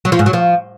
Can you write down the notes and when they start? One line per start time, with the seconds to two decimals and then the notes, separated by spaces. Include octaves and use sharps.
0.05 F#3
0.12 F3
0.19 G#2
0.26 F#3
0.33 F3